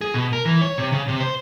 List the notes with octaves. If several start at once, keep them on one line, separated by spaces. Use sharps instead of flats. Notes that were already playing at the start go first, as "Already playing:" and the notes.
G#4
B2
A#4
E3
C#5
C3
C#3
C3
C5